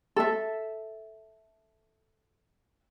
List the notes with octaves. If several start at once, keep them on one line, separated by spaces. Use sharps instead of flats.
A4 E5